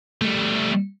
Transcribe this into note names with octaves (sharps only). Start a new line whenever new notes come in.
G3 A3